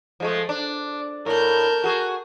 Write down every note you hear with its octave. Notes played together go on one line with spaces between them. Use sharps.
F3 G#3 A3
D4
A2 A#4 A5 G6
F#4 G#4